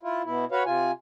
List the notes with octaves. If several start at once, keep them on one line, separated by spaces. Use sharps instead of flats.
E4 F4
B2 E4
F#4 B4 C#5 F5
C3 F4 G#5